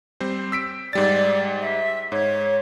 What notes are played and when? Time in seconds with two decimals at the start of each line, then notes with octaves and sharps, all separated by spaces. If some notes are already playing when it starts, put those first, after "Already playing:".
0.21 G3 C4 C5
0.52 E6 B6 D7
0.93 G#2 G3 D5 A6
1.62 E5
2.12 G#2 C#5